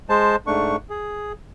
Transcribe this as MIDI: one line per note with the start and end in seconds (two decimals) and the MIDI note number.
0.09 0.36 56
0.09 0.36 72
0.09 0.36 81
0.47 0.76 44
0.47 0.76 57
0.47 0.76 62
0.47 0.76 85
0.90 1.32 68